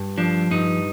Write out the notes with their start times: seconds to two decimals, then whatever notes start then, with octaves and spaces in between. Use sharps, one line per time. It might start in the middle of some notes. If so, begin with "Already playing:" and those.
Already playing: G2
0.18 F3 D4
0.51 G2 D#4